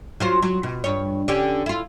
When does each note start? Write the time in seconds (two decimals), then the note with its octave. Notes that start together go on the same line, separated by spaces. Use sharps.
0.20 F#3 F4 C5
0.42 F#3
0.63 B2
0.84 G2 C#5
1.28 D3 C#4 G4
1.66 E4 F4